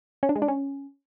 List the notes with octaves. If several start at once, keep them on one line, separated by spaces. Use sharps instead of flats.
C#4
D4
G#3
D4
C#4